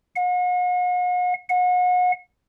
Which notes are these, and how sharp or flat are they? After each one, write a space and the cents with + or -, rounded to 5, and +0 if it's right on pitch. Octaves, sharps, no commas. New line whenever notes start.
F#5 -45
F#5 -35